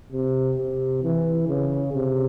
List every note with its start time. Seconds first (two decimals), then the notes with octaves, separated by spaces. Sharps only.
0.12 C3
0.58 C3
1.03 E3
1.48 C#3
1.93 C3